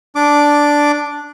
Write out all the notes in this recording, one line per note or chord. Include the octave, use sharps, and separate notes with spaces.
D4 D6